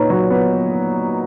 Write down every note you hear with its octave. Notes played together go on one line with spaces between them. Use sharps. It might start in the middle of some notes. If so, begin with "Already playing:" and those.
Already playing: A#2 D#4 B4 C#5
F#3
B3